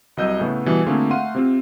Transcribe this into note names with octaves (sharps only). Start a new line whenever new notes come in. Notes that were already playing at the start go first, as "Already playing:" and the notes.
C2 F#3 D#5 E6 G6 D#7
A2 C#3 A3 B3
B2 E3 G3
D3 A3 A#3 C4 F4 G#4
A3 F5 F#5 C6 D#7
C3 C4 F4